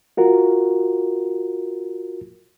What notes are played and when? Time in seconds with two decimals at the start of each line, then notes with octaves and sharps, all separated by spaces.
0.17 F4 F#4 A#4